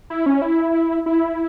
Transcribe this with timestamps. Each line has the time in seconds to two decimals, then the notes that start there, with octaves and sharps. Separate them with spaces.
0.10 E4
0.26 C#4
0.42 E4
1.06 E4